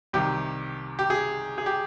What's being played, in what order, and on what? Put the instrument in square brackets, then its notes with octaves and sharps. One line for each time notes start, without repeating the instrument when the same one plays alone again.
[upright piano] C2 C3 D#3 G4
G4
G#4
G#4
G4